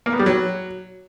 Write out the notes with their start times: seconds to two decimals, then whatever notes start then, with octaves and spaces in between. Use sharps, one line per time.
0.06 A#3
0.13 B3
0.19 G3
0.26 F#3